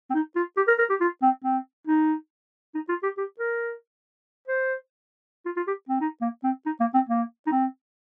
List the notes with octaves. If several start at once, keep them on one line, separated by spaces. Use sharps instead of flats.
C4
D#4
F4
G4
A#4
A#4
G4
F4
C4
C4
D#4
D#4
F4
G4
G4
A#4
C5
F4
F4
G4
C4
D#4
A#3
C4
D#4
A#3
C4
A#3
D#4
C4